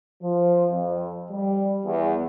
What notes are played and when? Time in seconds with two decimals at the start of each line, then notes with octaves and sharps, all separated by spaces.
0.22 F3
0.71 F2
1.30 G3
1.85 E2